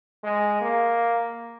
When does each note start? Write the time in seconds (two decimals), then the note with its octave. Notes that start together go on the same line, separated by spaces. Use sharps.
0.24 G#3
0.62 A#3